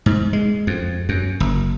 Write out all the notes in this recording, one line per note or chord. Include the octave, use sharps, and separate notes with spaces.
G#2
G#3
F2
F#2
F#1